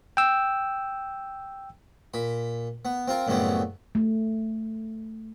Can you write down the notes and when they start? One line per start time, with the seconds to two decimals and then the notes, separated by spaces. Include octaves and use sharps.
0.17 G5 E6
2.14 A#2 B5
2.85 B3
3.08 C4 F4 A#4
3.27 F#2 A2 C#3 G3 B3 C4
3.95 A3